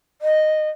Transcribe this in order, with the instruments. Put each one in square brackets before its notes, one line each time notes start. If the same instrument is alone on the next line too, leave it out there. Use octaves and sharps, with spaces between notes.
[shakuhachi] D#5